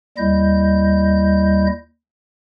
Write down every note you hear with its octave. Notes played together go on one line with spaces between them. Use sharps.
D#2 G3 E4 D#5 G6